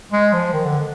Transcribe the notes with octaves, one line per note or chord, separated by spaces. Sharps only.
G#3
F3
D#3
D3